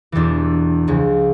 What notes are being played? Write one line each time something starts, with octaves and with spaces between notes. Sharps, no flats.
E1 E2 E3 G3 D4
C#2 C#3 F3